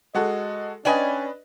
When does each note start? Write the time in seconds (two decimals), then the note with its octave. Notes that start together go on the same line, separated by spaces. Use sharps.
0.15 G#3 F#4 A4 D#5
0.85 C#4 D4 B4 D5 D#5 G5 G#5